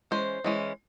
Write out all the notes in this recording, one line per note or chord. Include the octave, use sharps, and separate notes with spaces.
E3 G#3 C#4 C5
E3 G#3 C#4